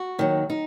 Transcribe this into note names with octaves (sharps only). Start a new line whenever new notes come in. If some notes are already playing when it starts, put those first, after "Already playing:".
Already playing: F#4
D#2 D#3 F#3
D#4